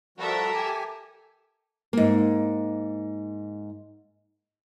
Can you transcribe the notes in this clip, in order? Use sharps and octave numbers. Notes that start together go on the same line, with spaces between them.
F3 G3 F#4 A4 A#4 E5
G4 G#5
G#2 A#3